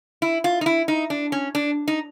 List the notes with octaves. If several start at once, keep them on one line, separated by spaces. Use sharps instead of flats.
E4
F4
D#4
E4
D#4
D4
C#4
D4
D#4